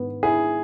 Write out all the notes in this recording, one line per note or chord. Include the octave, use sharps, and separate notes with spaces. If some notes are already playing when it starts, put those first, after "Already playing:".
Already playing: G#2 B3
E4 G#4